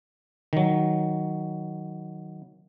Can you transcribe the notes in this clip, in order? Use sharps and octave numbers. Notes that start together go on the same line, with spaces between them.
D#3 F#3